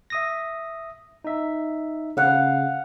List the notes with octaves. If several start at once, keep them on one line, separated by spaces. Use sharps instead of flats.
E5 D#6 A#6
D#4 E5
C#3 F5 F#5